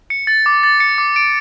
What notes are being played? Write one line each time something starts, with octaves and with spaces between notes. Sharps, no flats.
C#7
A6
D6
A6
C#7
D6
D7